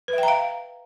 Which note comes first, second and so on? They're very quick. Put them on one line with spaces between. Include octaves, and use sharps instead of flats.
B4 E5 G5 A#5 F5